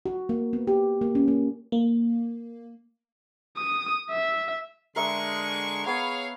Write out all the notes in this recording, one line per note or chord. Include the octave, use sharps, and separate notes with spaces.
F#4
A#3
B3
G4
A#3
C#4
A#3
A#3
D#6
E5
D3 G#3 A#4 E5 C#6
B3 G#4 C#5 F5